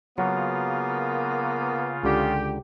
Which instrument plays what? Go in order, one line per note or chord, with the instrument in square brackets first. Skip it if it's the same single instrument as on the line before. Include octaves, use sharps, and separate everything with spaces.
[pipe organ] C#3 F4 [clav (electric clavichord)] F#3 F#4 [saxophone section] A#3 B3
[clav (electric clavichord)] C#2 D3 [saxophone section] G4